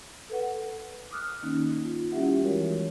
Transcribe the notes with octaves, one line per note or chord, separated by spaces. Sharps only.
A4 B4 F#5
D6 D#6 F6 F#6
D#3 A#3 C#4 D#4
F4
G3 C#4 E4 G4 E5 F#5
E3 G#3 F#4 A#4 C#5